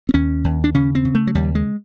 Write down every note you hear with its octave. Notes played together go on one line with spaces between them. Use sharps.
C4
D#2 C#4
D#2
D4
C#3 C#4
C4
C#3
A3
F#3
D#2 G3
G#3